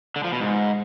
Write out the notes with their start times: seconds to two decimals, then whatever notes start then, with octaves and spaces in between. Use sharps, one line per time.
0.16 D3
0.24 F3
0.32 B2
0.41 G#2